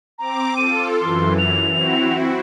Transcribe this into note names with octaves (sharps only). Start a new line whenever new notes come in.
C4 A#5 D6
F4 A4 D#7
F#2 E3 C6
F7
C4 E4 F#4